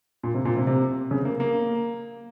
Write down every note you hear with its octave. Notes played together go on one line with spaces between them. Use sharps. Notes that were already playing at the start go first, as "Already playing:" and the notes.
A#2
C3
A#2
C3
C3
C#3
A#3
A#3